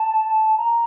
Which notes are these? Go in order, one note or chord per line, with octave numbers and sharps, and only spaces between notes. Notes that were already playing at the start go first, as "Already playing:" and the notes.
Already playing: A5
A#5